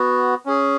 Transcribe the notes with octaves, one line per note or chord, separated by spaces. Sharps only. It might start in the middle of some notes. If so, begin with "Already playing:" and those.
Already playing: B3 F#4
C#4 G#4